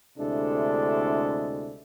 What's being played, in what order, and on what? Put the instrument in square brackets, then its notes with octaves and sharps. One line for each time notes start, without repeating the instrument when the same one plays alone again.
[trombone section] D2 C3 G#3 D4 E4 A4